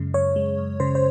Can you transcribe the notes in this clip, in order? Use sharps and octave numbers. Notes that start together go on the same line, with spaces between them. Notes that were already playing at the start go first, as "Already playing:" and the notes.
Already playing: F#2 C#3 G#3
F#2 C#5
G#3
F#2
C#3 C5
C5